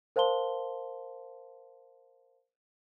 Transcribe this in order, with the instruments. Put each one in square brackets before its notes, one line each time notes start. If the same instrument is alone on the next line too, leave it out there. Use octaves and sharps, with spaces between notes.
[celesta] A#4 C5 F5 A5 C6 G7